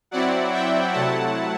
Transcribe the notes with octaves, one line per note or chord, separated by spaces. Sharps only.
F#3 C4 E4 D5 F#5
E5 G5
C3 F#3 A3 E4 F#5 A5